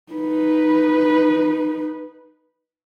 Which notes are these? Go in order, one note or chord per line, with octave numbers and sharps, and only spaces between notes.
D#4 B4